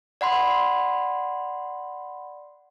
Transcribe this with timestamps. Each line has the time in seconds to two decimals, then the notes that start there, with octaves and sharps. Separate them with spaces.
0.21 D5 F#5 B5 C6